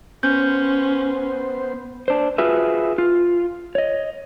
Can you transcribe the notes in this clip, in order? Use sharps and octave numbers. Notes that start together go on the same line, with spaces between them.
B3 C#4 C5 G6
D4 C5
F4 F#4 G#4 B4 E5
F4
C#5 D#5